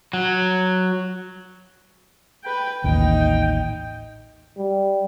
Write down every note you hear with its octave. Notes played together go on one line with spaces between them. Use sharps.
F#3
B4 G5
A1 D#2 D#4 G5
G3